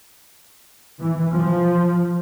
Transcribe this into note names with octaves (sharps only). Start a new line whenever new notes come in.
E3
F3